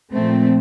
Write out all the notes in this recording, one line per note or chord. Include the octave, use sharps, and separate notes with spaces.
A#2 F3 A3 C4